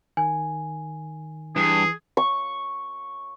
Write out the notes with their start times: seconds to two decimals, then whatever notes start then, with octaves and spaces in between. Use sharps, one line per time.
0.17 D#3 G#5
1.56 G2 E3 G#4
2.17 C#6